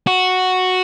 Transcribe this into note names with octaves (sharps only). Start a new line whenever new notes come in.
F#4